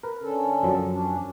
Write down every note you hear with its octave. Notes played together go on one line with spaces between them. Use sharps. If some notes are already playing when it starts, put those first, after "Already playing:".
A#4 B4
D3 C#4 A4
F#2 F3 F#3
C#4 D4